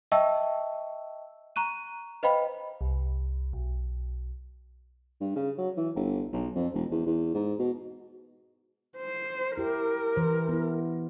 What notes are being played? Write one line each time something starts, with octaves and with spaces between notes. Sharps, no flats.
D#5 E5 G5 A5 C#6 E6
A#5 C#6 F#6 D#7
B4 C5 D#5 F5 G5 B5
C2
B1
G2
C#3
F#3
E3
G1
B1
F2
E1
E2
E2
G#2
B2
C5
E4 G4 A#4
E3 C5
B3 E4